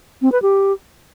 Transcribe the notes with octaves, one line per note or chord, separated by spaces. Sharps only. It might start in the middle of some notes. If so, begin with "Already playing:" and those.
C4
B4
G4